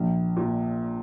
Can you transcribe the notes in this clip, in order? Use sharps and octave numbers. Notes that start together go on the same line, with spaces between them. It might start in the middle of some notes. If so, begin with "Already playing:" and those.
Already playing: A#1
A#2 F3